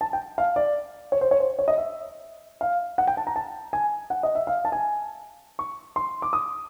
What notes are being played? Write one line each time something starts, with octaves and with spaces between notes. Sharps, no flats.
A5
G5
F5
D5
C#5
C5
C#5
C5
C#5
D#5
E5
F5
F#5
G5
A5
A#5
A5
G#5
F#5
D#5
E5
F5
A5
G#5
C#6
C6
D6
D#6